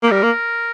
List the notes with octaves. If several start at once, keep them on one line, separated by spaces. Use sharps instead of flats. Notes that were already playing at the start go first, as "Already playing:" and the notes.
A#3
G4
G3 A#4
A#3